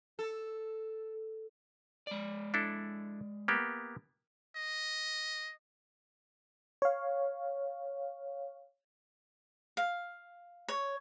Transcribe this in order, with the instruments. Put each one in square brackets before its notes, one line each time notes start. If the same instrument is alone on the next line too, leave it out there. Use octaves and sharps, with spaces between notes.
[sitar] A4
[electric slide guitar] G#3 D5
[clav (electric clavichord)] D4 E4 A4
A#3 B3 G4
[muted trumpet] D#5
[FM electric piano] C#5 F5
[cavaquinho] F5
C#5